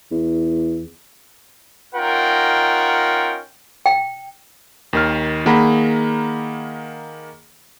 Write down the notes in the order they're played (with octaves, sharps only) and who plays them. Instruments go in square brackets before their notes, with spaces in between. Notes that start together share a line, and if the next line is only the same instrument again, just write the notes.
[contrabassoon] E2
[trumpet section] C#4 D#4 F4 A#4 F#5 G5
[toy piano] G5
[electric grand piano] D#2 D#3 F6
D#3 A#3 G#4 F#5 A#5 B5